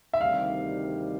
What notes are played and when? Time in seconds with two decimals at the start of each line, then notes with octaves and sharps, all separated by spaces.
0.13 E5
0.20 D2 C3 D#3 G3 F5